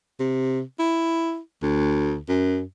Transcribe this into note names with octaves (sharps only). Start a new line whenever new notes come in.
C3
E4
D2
F#2